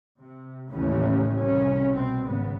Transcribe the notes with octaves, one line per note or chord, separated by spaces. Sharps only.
C3
A1 D#2 A2 C#3 E3 C#4
C2 C#4
B2 C4
G#1 G#2 C#3 B3